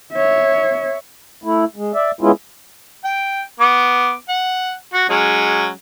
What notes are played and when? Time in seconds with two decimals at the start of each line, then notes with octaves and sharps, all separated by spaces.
0.14 C#5 E5
1.44 A3 E4
1.76 G#3
1.94 D5 E5
2.21 G#3 B3 C#4 E4 F4
3.04 G5
3.60 B3 D6
4.29 F#5
4.93 F#4
5.10 F#3 G#3 C#4